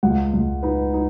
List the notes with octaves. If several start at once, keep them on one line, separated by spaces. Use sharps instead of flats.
C#2 F#5
C#2
D#4 B4
D#4